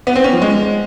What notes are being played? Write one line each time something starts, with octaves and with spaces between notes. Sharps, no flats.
B3
C4
C#4
F3
G#3